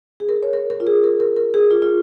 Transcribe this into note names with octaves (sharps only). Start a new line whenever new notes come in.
G#4
A#4
C#5
A#4
A#4
F4
G#4
A#4
A#4
A#4
G#4
F4
F4